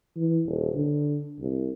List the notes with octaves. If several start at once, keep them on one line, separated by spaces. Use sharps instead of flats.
E3
D#1
D3
C2